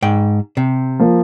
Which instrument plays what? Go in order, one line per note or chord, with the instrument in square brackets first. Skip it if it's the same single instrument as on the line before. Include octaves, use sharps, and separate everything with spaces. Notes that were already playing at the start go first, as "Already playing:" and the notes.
[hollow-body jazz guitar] G#2 G5
C3
[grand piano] F3 A#3